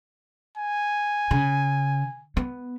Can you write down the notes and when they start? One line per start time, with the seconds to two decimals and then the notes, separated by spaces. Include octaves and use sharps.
0.57 G#5
1.31 C#3
2.37 B3